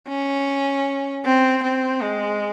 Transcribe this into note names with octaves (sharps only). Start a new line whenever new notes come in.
C#4
C4
C4
G#3